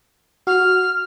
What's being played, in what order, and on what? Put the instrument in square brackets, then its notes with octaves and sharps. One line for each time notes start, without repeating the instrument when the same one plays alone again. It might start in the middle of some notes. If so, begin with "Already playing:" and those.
[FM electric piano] F#4 [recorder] F6